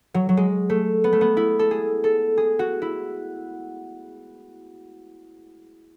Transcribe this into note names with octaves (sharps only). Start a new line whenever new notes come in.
F#3
F#3
G#3
A3
B3
A3
B3
E4
A4
G#4
A4
G#4
F#4
E4